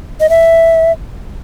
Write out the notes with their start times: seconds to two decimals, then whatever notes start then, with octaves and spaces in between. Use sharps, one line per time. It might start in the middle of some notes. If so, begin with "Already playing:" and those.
0.20 D#5
0.30 E5